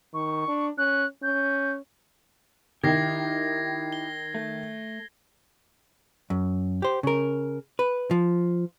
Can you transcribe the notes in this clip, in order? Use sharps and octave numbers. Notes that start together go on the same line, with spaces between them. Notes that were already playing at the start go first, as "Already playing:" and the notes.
D#3 C#6
D4
C#4 F#6
C#4 G6
D#3 E4 G4 G#6 A#6 C7
G7
A3
F#2
G4 C5
C#3 A#4
B4
F3